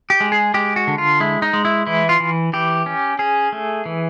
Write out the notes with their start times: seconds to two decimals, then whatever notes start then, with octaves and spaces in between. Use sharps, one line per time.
0.10 G4
0.20 G#3
0.32 G#4
0.54 G#3 G4
0.76 F#4
0.88 D3
0.98 F4
1.20 G#3 E4
1.42 D#4
1.53 G#3
1.65 E4
1.86 E3 E4
2.09 F4
2.20 E3
2.53 E3 G4
2.86 C#4
3.19 C#4 G#4
3.52 A3
3.86 E3